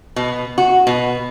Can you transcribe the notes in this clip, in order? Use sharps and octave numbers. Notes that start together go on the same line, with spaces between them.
B2
F#4
B2